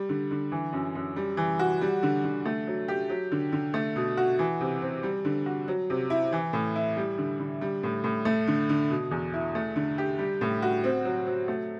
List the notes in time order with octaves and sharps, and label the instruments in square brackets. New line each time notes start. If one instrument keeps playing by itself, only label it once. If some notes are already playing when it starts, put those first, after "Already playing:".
Already playing: [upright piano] G3
D3
D3
E3
F#2
F#2
G3
E3
F#4
G3
D3
D3
A3
F#3
G4
F#3
D3
D3
A3
B2
F#4
E3
C3
C4
G3
D3
F#4
F#3
C3
E4
E3
A2
E4
G3
D3
D3
G3
A2
A2
A3
D3
D3
B2
E2
E4
A3
D3
G4
G3
A2
F#4
C4
F#3
F#3
A3